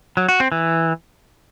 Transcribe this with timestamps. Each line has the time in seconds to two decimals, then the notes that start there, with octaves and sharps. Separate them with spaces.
0.17 F#3
0.29 F#4
0.40 C4
0.52 E3